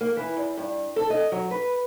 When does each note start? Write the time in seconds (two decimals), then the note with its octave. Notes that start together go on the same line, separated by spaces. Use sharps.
0.01 A#3
0.16 E3
0.37 E2
0.57 G2
0.96 A4
1.10 D#5
1.32 F#3
1.51 B4